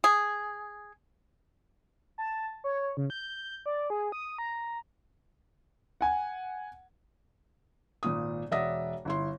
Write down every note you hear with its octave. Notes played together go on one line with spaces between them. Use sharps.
G#4
A5
C#5
C#3
G6
D5
G#4
D#6
A#5
F#5 G#5
G#1 A#2 D#6
E1 D5 E5 F#5 D#6 A#6
G1 E4 C6